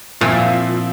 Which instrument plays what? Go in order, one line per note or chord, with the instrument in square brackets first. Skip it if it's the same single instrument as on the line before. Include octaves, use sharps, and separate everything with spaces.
[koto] A#2 [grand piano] F3 C4 E4